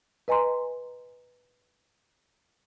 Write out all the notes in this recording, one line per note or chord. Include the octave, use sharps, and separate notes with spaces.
B4 D#5 G#5 A#5 C6